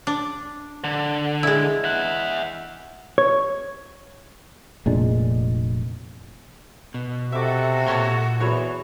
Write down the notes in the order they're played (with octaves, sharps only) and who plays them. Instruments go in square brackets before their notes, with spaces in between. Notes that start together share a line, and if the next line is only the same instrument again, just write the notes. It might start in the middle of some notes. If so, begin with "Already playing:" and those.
[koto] D4
[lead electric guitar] D3
[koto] G#3 E4
[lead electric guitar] E5 F#5
[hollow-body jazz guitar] C#5
[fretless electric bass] F1 A#2 G#3 D4
[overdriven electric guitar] B2
[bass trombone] C3 [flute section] F#4 A4 [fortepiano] E5 D6
[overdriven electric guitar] A#2 C6 [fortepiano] C#5 A5
[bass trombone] E2 [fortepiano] E3 F#3 C#5